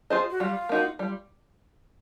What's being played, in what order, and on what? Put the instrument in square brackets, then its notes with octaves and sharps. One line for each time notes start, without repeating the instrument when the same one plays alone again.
[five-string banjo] F4 G#4 C5 D#5
[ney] F#4
[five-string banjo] G3 [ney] F4
[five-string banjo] A#3 D#4 F#4
[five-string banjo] G3 [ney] F4